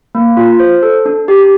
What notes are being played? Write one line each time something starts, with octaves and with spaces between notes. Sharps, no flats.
A#3
F4
C5
A4
D4
G4